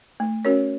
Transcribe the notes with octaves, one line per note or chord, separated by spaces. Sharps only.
A3
C#4 F#4 A#4 C#5